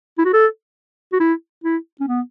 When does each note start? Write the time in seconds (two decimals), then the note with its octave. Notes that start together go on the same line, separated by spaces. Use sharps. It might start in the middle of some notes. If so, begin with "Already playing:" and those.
0.18 E4
0.25 F#4
0.33 A4
1.13 F#4
1.20 E4
1.64 E4
2.00 C#4
2.08 B3